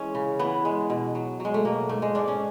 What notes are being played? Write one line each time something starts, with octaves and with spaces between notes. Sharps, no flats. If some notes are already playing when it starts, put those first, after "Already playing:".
Already playing: E3 G#3 C#4
C#3
E3 B3
G#3
B2
F#3
F#3
G#3
A3
B2 A#3
G#2 A3
G#3
G#2 D4
C#4